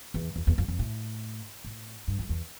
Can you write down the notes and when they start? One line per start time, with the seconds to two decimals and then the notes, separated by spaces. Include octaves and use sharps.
0.14 E2
0.36 E2
0.47 E2
0.58 F2
0.68 F2
0.79 A2
1.64 A2
2.08 G2
2.19 F2
2.29 E2